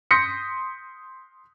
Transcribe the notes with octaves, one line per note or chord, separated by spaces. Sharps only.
C6 D#6 G6 A#6 B6 C#7